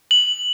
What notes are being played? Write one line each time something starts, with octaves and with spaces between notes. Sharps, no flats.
F#7